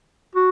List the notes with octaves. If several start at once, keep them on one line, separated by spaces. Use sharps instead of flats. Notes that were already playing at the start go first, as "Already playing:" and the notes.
F#4